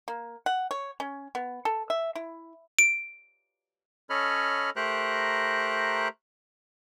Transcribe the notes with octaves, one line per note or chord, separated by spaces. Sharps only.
A#3
F#5
C#5
C#4
B3
A4
E5
E4
D7
C#4 A4 C#5 D#5 B5 F6
A3 G4 A#4 C5 A#5 F#6